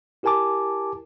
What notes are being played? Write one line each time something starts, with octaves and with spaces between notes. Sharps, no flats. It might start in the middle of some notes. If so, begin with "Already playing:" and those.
E4 G4 A#4 G#5 A5 D6